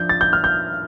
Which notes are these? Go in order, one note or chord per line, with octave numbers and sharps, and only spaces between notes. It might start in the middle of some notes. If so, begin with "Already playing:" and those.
Already playing: F3 D4 G6
A6
G6
F6
G6